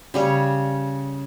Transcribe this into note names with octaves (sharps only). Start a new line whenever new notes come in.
C#3 G3 C#5